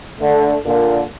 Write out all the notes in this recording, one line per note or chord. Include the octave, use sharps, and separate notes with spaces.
D3 A3
A#2 D3